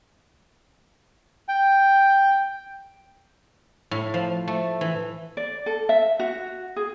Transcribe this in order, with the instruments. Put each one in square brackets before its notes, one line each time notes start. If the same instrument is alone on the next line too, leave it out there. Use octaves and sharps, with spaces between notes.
[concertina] G5
[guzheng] A2
F3
A3
E3
[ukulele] D5
A4
E5
F#4
G#4